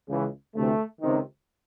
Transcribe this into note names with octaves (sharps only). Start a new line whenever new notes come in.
C#2 C#3 E3
D2 C3 E3 A3
C#2 C3 D#3